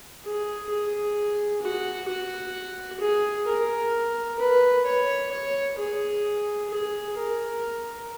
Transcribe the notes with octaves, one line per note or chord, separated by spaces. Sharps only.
G#4
G#4
F#4
F#4
G#4
A#4
B4
C#5
C#5
G#4
G#4
A#4